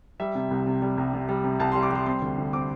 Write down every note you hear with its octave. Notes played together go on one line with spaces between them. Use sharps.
G3 E5
C3
C2
C3
G3
C2
C3
G3
C3
C2 A5
C6
G3
D6
G3 C6
C4 C6
D2
D2
C4 D6